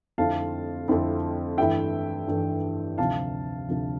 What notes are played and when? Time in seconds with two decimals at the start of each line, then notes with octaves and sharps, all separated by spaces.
0.18 F2 D3 A3 C4 E4 F5 A5
0.88 F2 D3 A3 C4 E4
1.58 G2 E3 A3 E4 E5 G5
2.28 G2 E3 A3 E4
2.98 D2 C3 F3 F5 A5
3.68 D2 C3 F3